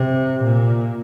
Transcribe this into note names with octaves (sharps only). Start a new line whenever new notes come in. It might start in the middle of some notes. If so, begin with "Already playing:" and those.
Already playing: C3
A#2